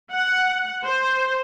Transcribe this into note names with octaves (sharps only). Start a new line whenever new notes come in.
F#5
C5